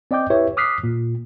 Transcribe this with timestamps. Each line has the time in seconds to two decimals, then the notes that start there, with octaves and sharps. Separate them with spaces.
0.11 C4 D5 D#5 G5 D6 G6
0.30 E4 G4 B4 C#5 E5
0.57 D6 D#6 F6 F#6 B6 C7
0.84 A#2